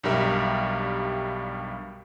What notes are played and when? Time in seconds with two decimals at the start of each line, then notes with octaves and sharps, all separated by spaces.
0.04 B1 G2 G3 G4 A#4 E5